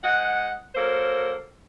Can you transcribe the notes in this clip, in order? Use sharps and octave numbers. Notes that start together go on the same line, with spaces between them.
G#2 D#5 F#5
F#3 A#3 A4 A#4 C5